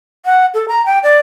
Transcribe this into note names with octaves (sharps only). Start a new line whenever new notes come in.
F#5
A4
A#5
G5
D5